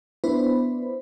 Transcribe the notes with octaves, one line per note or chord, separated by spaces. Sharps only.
B3 D4 E4 B4 C5 B5